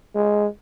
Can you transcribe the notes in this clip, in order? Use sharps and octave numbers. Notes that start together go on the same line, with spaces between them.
G#3